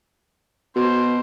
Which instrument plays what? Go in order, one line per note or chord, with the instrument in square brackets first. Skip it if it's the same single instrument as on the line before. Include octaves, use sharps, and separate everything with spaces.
[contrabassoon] B2 [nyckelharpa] C5